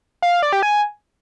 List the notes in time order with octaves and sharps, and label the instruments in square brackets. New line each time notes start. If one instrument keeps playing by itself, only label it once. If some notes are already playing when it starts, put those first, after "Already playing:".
[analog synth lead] F5
F5
D5
G4
G#5